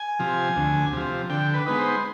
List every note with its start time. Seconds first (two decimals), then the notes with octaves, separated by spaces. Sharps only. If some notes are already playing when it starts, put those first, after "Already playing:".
Already playing: G#5
0.19 C3 F3
0.56 D2
0.93 C3 F3
1.30 D3 G5
1.54 B4
1.66 G#3 B3 D#4 B4
1.79 C5